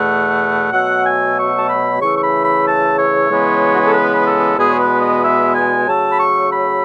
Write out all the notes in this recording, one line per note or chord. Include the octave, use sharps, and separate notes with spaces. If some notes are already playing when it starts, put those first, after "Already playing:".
Already playing: E2 B2 A3 F#5
B2 F#3 A3 F#5
G#5
C#6
A5
B5
C#3 E3 A3 C#6
C#6
B5
B5
A5
C#5
C#3 E3 G#3 B3
F#4
G#4
A4
B4
A4
E2 B2 G#3 B3 G#4
C#5
B4
D#5
E5
G#5
C#3 F#3 A3 A5
B5
C#6
B5